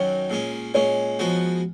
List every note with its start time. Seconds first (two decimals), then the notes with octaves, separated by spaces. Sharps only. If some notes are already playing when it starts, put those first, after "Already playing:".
Already playing: F#2 D#3 F#3 C#5
0.30 A#2 G#3 C#4
0.74 A#2 G#3 C#4 C#5
1.19 F3 G#3 B3 F#4